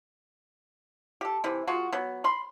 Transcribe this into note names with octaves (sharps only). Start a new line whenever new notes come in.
G4 A4
C3 E3
G#3 F4 F#4
F#3 B3
B5 C6